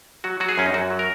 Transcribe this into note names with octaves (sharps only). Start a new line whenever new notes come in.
F#3 F#4
F#3 F#4
G#4
F#2 C#4
D#4
F#2 F#4
F#3
A#4